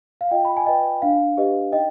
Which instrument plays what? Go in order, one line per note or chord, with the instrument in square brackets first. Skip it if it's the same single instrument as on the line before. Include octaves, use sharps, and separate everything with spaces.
[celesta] F5
F4 D#5 G5
B5
G#5
B4 D5 D#5 G5
D4 F5
G4 B4 D#5
D#4 D#5 G5